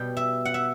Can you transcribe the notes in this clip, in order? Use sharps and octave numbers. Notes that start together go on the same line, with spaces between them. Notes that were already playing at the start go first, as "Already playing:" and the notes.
Already playing: B2 G3 G5
E5
F#5
E5